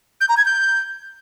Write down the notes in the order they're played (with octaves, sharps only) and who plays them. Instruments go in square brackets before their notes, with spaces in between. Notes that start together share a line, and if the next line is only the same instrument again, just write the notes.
[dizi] G6
A#5
G#6
G6